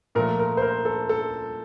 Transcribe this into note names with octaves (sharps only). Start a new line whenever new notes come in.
A#2 F3 A3 A#4
A#4
C5
A#4
A4
A4